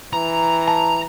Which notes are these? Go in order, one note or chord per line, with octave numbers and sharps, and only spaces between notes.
E3 A#5
A5 A#5